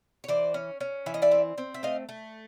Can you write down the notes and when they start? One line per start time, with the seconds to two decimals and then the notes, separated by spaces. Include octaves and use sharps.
0.24 C#5
0.28 E3 C5 D5
0.54 C#4
0.80 C#4
1.06 E3 E5
1.14 D#5
1.22 D5 E5
1.31 C4
1.58 C4
1.74 E5
1.83 A3 D#5 F5
2.09 A3